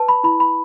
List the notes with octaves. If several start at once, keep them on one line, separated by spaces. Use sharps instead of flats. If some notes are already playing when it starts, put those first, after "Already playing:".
Already playing: B4 A5
B5
E4 B5
B5